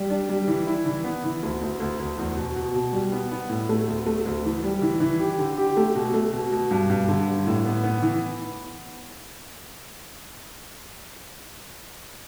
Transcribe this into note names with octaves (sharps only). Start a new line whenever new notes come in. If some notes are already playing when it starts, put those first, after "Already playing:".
Already playing: G3
D4
G3
E3
E4
E3
B3
E3
D2
D2
D2
D2
E2
B2
B2
B2
G3
B3
B3
A2
A3
D2
A3
D2
E3
G3
E3
E3
G4
D3
G4
A3
B2
A3
B2
B2
G2
G2
D3
G2
A2
B3
B3
E3